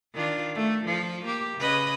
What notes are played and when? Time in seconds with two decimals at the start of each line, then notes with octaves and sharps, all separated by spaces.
0.15 D#3 D4 F4
0.55 A3
0.85 F3 F4
1.25 A#3 G4
1.57 C#3 B4 D#5